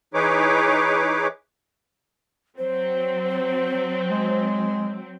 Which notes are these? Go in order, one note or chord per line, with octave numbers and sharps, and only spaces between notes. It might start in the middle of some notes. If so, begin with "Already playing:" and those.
E3 D#4 G#4 B4 C#5 D6
F#3 C4 C5
G#3